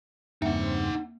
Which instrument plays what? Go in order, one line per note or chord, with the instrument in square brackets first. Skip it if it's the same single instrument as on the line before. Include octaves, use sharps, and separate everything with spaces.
[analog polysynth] E2 C#3 C4 [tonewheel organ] G2 [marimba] A#3 E5 [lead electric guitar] D#4 F#5